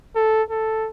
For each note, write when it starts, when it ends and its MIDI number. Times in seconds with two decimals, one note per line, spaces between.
0.16 0.43 69
0.50 0.89 69